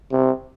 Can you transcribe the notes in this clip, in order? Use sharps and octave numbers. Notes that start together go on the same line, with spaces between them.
C3